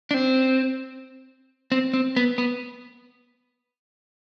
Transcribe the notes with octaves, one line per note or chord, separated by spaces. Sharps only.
D4
C4
C4
C4
B3
B3